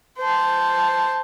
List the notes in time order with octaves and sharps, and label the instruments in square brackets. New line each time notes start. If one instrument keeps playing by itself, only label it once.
[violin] C5 A5